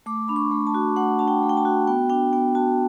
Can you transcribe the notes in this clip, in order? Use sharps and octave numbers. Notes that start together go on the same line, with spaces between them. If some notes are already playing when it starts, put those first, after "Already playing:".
A3 D6
D4 B5
C#6
A3
A5
F#4
A3 F#5
D4 A5
G5
A3
G5
A5
F#4
B3 G5
D4 G5
B3 G5
F#4 A5